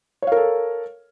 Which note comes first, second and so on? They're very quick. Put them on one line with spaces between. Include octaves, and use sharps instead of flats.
C#5 F5 A#4 A4